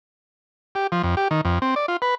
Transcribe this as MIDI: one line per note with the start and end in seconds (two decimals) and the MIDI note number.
0.75 0.87 67
0.92 1.02 53
1.03 1.15 41
1.17 1.28 67
1.31 1.41 51
1.45 1.59 41
1.62 1.75 60
1.76 1.86 74
1.88 1.97 65
2.02 2.15 71